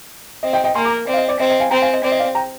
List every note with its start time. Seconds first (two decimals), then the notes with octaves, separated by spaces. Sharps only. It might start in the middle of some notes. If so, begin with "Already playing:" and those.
0.43 C4 D#5
0.53 D#5 G5
0.64 D#5 G5
0.75 A#3 G#5 C6
0.85 A#5 D6
1.07 C4 D5
1.13 F5
1.17 D#5
1.28 D5
1.39 C4 D#5
1.50 D#5
1.60 F5 G#5
1.71 C4 G5 A#5
1.82 F5 G#5
1.93 D#5
2.03 C4 D5
2.12 D#5
2.20 D5 F5
2.35 G5 A#5